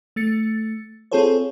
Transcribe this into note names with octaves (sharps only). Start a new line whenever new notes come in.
A3 A6 C#7
C4 F4 G#4 A4 C5 C#5